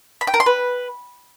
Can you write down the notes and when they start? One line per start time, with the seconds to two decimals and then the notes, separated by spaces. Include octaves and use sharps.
0.21 B5
0.27 G5
0.34 A#4
0.40 C6
0.46 B4